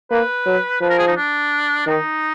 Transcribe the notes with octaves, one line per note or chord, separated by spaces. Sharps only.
A#3 B4
F#3
F3 B4
A#4
G#4
D#4
D4
D#3 D#4